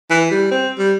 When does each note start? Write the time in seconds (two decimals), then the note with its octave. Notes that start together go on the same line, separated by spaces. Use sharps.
0.10 E3
0.31 G3
0.51 C4
0.78 G3